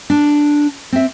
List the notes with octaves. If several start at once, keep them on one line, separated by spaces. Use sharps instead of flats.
D4
C4 E5